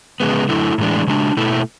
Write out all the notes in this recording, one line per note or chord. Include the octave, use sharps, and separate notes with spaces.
C#3 G#3 B3
F#2 D3 A3 E4
A2 E3 G#3 D4
C#3 G#3 D4
B2 A3 E4